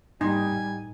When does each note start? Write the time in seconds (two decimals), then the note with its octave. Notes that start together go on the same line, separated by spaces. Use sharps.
0.21 G#2 G3 A#3 C4 D#4 G#5
0.52 A2